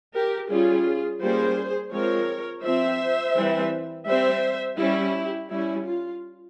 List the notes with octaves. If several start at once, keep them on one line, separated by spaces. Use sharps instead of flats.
G4 A#4
G3 C#4 F4 G#4
G3 A#3 C#4 G#4 C5
F3 G#3 C4 A#4 C#5
F3 C4 C5 E5
E3 G3 C4
G3 C4 C5 E5
G3 C#4 E4 G4
G3 C#4 E4
F4